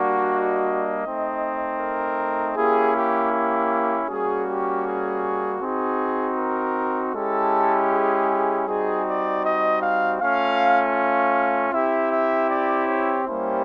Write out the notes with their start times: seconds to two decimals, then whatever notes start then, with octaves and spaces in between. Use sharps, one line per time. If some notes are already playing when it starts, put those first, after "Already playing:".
Already playing: G3 A#3 D4 F#4
0.27 D#5
1.04 A3 C4 D#4
1.80 A#4
2.56 A#3 C#4 E4 G4 G#4
2.94 G4
3.33 G4
4.09 G3 A#3 C#4 F#4 G#4
4.47 G4
4.85 G#4
5.62 C4 D#4 F#4 G#4
6.38 A#4
7.14 G#3 C#4 E4 G4 A4
7.91 G#4
8.29 G#4
8.67 G3 C4 D#4 F#4 G#4
9.06 D5
9.44 D#5
9.82 F5
10.20 A3 C#4 F4 F5
10.97 F5
11.73 C4 E4 G4 E5
12.11 E5
12.49 D5
12.88 C#5
13.26 G3 A#3 C#4 E4 G4 C5